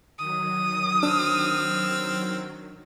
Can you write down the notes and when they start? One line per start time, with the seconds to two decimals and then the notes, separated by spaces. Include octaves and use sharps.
0.18 D#3 F#3 D#6
1.03 C4 D4 E6 F6